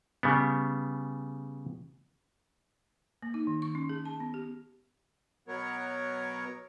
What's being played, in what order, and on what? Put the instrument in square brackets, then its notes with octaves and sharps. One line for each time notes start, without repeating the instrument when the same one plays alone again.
[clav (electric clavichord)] C#3 G3 B3
[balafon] A#3
D#4
D#3
C#6
C#4
G#4
A5
B3
G4
[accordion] B2 F#3 B3 A#4 C#5